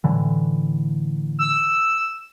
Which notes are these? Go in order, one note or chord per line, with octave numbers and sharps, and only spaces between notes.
A2 D3 E3
E6